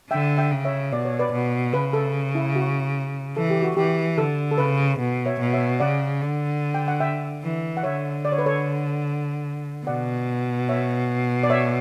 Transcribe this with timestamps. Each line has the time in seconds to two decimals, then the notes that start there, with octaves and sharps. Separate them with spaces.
0.11 D3 E5 G5
0.37 E5 G5
0.52 C#3
0.65 C#5 E5
0.92 B2 D5
1.05 C#5
1.19 B4 D5
1.33 B2
1.74 C#3 B4
1.93 A4
2.35 E4
2.56 F#4
3.36 E3 A4
3.50 G4
3.63 F#4
3.77 E3 G4
4.17 D3 A4
4.51 A4
4.58 C#3 B4
4.99 B2
5.26 C#5 E5
5.40 B2
5.53 C#5 E5
5.80 C#3 D5 F#5
6.21 D3
6.74 G5
6.88 F#5
7.00 E5 G5
7.43 E3
7.77 F#5
7.83 D3 C#5 E5
8.25 D5
8.32 C#5
8.38 B4
8.46 A4 C#5
9.87 B2 D5 F#5
10.69 C#5 E5
11.43 D5
11.50 C#5 E5